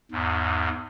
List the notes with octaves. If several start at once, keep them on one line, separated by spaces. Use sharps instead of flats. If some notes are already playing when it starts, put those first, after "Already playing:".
E2 G#2